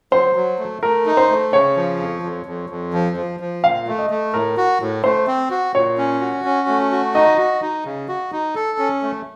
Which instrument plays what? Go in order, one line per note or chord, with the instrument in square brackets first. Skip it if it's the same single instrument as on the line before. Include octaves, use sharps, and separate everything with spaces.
[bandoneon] F#3 [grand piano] C5
[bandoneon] F#3
A3
[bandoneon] A3 [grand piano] A#4
[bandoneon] D#4
[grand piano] C5
[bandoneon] A3
[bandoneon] C#3 [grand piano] C#5
[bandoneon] F3
F2
F2
F2
F2
F3
F3
F3
[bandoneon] A#2 [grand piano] F5
[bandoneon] A3
[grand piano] D#5
[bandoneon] A3
[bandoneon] A2 [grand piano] A#4
[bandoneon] F#4
A2
[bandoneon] A3 [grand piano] C5
[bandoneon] C4
F#4
[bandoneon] A#2 [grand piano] C#5
[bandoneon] C#4
F#4
C#4
A3
F#4
[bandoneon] D#4 [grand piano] D#5
[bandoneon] F#4
D#4
C#3
F#4
D#4
A4
C#4
A3